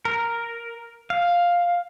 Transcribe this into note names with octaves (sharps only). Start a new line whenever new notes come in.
A#4
F5